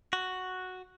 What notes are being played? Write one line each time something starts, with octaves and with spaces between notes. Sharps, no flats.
F#4